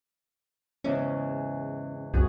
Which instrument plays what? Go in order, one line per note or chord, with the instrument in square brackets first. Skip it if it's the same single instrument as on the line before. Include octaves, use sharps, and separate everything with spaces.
[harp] E2 G#2 C#3 [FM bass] C#4
[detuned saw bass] C2 [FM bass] F#2 [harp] F#4 G#4